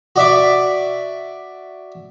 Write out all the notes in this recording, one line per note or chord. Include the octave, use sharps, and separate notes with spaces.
F#4 D5 E5 D6